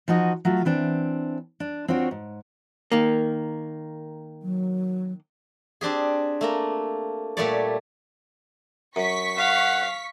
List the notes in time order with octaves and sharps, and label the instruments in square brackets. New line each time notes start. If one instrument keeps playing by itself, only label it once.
[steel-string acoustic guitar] F3 D#4 F#4 D#5
F#3 A3 F4
E3 C4 D4
D4
C4 D4 F4 F#4 C#5
G#2
[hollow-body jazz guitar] D#3 A#3
[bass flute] F#3
[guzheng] C4 D4 G4 G#4
A3 A#3 A#5
A#2 G3 A3 G4 C#5 D5
[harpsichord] F#2 [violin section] C#6 B6
[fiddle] F5 [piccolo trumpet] F#5